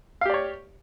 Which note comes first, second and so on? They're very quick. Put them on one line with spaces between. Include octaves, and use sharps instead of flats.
F5 G4 D5 C#5